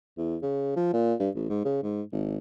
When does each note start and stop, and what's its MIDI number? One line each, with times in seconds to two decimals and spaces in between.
0.17 0.37 40
0.42 0.76 49
0.76 0.91 53
0.93 1.14 46
1.19 1.29 43
1.35 1.44 33
1.49 1.64 44
1.65 1.82 49
1.83 2.02 44
2.12 2.37 32